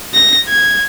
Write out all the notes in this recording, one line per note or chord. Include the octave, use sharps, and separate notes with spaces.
A#6
G#6